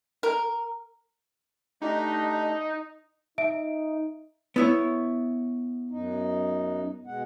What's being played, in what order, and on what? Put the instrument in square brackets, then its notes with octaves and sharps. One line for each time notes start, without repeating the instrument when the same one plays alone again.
[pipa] A#4
[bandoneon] A3 D4 G4 [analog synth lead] D#4 [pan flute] D#5
[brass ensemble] D#4 [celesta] E5 D7
[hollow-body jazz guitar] B3 E4 C#5
[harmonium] F#2 D#4
B2 G#3 F#5